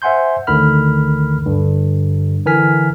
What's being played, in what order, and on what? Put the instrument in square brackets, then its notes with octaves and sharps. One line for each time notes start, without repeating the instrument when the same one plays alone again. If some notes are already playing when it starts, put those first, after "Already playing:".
[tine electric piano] C5 E5 F#5 G#5 C6 G6
D2 D3 D#3 A#4 B5 F6
G2 D3
D3 E3 A#4 G#5 F6 B6